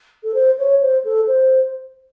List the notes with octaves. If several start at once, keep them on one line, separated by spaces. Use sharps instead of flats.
A4
C5
C#5
C5
A4
C5